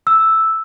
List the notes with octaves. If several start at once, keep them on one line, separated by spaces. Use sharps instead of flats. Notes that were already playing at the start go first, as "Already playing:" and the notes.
E6